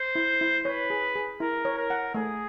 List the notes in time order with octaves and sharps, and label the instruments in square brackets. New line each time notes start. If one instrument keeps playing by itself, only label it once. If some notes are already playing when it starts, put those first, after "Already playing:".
Already playing: [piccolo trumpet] C5
[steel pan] E4
E4
[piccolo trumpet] B4 [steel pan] C#5
[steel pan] G#4
G#4
[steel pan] E4 [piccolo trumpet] A#4
[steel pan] C#5
[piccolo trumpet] A#4
[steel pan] F#5
[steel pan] A3 [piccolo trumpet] G#4